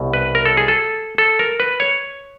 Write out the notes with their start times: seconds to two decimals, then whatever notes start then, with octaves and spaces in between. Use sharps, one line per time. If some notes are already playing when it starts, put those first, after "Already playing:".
Already playing: C2 B2
0.14 B4
0.35 A#4
0.46 A4
0.57 G#4
0.68 A4
1.18 A4
1.39 A#4
1.60 B4
1.80 C#5